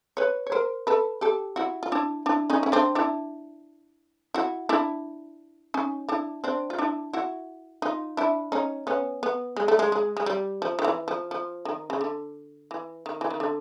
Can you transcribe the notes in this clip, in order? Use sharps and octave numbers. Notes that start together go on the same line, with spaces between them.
B4 C#5
C#5
A#4 C5
A4 B4
G4 A4
E4 F#4
F4
D4 E4
D4 E4
C#4 D#4
C#4
C4 D4
D4 E4
E4 F#4
D4 E4
C#4 D#4
D4 E4
C4 D4
F4
D4 E4
E4 F#4
D#4 F4
D4 E4
C#4 D#4
B3 C#4
B3
G#3
A3
G#3
G#3
G#3
G3
F3
D#3
E3
F3
F3
D#3
C#3
D3
E3
D#3
E3
D#3
D3